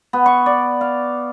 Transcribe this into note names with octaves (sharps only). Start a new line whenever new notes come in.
B3
C#6
D5
F5